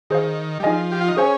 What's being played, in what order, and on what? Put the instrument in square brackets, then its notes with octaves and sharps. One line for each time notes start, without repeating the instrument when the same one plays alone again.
[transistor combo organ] D#3 [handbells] G#4 C5 F5
[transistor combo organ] G3
[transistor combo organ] F3 [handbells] D#4 G#4 D#5 G#5
[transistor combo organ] G4
F4
D#4
[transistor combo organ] C#4 [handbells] G#4 C5 F5 G#5